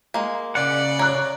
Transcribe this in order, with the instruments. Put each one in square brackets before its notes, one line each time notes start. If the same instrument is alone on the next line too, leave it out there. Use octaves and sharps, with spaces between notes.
[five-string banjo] G#3 A#3
[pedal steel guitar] C#3 F#5 [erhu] D5
[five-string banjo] C#5 [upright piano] A#5 F#6